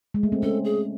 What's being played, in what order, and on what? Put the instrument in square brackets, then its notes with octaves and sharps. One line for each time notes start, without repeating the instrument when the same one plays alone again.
[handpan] G#3
A3
C4
[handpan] C#4 [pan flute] A4
[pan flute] G#4